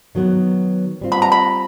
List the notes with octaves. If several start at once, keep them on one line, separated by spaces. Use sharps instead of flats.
D#3 F#3 B3
G3 C4 F4
B5
A#5
B5